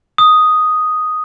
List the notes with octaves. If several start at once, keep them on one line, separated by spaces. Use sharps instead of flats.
D#6